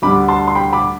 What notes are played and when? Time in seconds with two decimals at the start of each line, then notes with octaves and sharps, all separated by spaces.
0.02 D2 D3 G3 B5 D6
0.28 A5 C6
0.48 C6
0.55 G5 B5
0.73 B5 D6